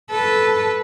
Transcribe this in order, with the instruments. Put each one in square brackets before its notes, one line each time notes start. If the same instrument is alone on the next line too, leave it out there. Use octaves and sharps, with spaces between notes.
[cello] A4 B4